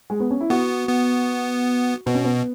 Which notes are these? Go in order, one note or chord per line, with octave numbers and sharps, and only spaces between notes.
G#3
B3
C#4
E4
B3 F#4
B3
B2 B3
C#4
B3